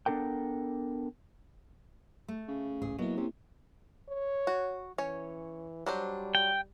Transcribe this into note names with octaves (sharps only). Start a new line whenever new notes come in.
B3 D4 A4 A#4 G5
A3
C#3
G#1 C#2 A2 G#4
B2 F#3 A#3 E4
C3 C#4
C#5
F#4
E3 C#4 C#5
F#3 G3 D4 C5
G5